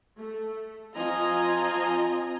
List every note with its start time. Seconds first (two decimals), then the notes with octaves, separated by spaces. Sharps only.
0.18 A3
0.96 F3 C4 F4 D#5 G#5 A#5